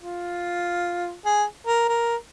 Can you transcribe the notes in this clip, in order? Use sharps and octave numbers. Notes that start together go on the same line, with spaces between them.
F4
G#4
A#4
A#4